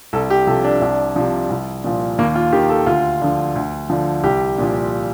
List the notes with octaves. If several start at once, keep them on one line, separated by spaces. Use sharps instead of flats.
C2 A4
G4
C3 F3 A4
D4
C2 D4
C3 F3
C2
A#2 F3
D#2 A#3
F4
D#3 G4
A4
D2 F4
D3 F3
D2
D3 F3
C2 G4
A#2 F3